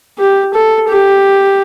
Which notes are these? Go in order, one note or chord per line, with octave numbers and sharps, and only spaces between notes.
G4
A4
G4